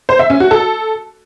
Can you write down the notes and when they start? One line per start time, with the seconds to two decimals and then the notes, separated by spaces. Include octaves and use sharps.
0.09 C5
0.19 E5
0.30 C#4
0.40 F#4
0.51 A4